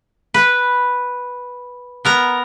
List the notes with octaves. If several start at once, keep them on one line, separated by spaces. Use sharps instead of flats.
B4
B3 A#4 A#5